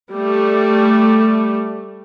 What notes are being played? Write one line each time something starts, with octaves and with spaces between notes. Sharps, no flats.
G3 A3